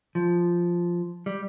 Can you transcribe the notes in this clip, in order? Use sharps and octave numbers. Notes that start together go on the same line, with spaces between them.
F3
G3